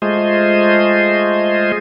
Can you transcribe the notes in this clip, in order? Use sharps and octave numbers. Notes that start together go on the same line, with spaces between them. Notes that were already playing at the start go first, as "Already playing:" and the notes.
G#3 A3 F4 G#4 C5 D#5